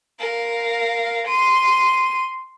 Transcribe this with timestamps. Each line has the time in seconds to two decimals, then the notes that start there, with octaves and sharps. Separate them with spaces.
0.19 A#4 F5
1.27 C6 D#7